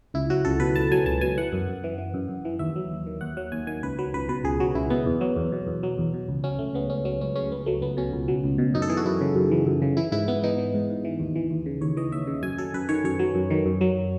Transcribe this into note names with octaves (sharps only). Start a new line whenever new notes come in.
C#2 E4
F#3 F#4
C#2 A4
B2 B4
C#2 A5
F#3 G#5
C#2 A5
B2 G#5
E3 F#5
F#2
F#2
E3
E3
F#2
F#2
E3
D#2 E5
F#3
D#2
D#3
D#2 F#5
F#3 F#5
D#2 G#5
D#3 G#5
C#2 B4
F#3 B4
C#2 B4
B2 B4
C#2 G#4
F#3 F#4
C#2 E4
B2 B3
E2
F#3
E2
B2
E2
F#3
E2
B2
C#2
F#3 C#4
C#2 A3
C#3 B3
C#2 C#4
F#3 C#4
C#2 C#4
C#3 C#4
C#2 B3
F#3 A3
C#2 B3
B2 C#4
C#2
F#3
C#2
B2
F#2 D#4
A4
E3 G#4
F#4
F#2 E4
C#3
F#2
E3
F#2
C#3
E3 E4
G#2 E4
G#2 B3
E3 D#4
E3
G#2
G#2
E3
D#2
E3
D#2
C#3
D#2 C#5
E3 D#5
D#2 E5
C#3
F#2 G#5
F#3 A4
F#2 B4
D#3 C#5
F#2 C#5
F#3
F#2
D#3
F#2
F#3